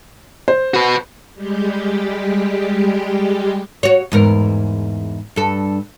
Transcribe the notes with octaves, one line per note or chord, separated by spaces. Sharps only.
C5
F#4 B4
G3 G#3 G4
F#4 C#5
E2 G#2 A#4
G2 A4